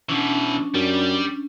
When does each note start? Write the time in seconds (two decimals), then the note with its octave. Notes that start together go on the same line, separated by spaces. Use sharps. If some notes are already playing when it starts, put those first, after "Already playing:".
0.09 B2 E3 C#4 D4
0.75 F#2 G3